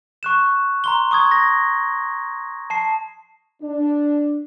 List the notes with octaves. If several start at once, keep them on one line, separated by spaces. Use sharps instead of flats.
C#6 F#6 E7
A#5 C6 G7
C#6 D#6 G#6
A#6
A5 C7
D4